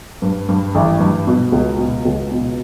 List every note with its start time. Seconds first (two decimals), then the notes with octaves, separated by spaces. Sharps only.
0.22 G2
0.49 G2
0.75 A1
1.00 G2
1.27 B2
1.52 C#2
1.78 B2
2.05 C#2
2.31 B2